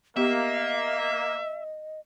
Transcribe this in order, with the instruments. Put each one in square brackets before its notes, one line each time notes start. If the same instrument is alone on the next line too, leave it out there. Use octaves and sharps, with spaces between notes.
[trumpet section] A#3 [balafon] B3 G4 [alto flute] D#5 [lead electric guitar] E5